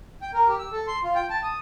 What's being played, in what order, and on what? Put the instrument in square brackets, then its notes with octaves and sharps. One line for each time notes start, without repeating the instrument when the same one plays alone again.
[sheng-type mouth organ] G5
A#4
G4
E6
A4
C6
F4
G5
A5
D#6